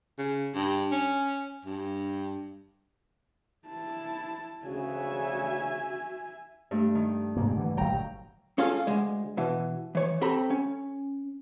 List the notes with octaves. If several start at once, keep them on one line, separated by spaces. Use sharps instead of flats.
C#3
G2
C#4
G2
E4 A5
D2 C#3 F#4 E5 G#5
G2 A3
D#3
G#2 C3 A#3
D3 E3
G1 A#2 F#3 G5 A#5
C#4 F4 G#4 A4 F5
D2 G#3
B2 E3
E3 C#5
C4 G4 A4 A#5 B5
C#4